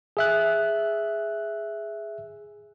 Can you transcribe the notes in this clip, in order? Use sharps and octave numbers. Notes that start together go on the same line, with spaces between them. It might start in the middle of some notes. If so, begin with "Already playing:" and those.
G#4 E5 F#6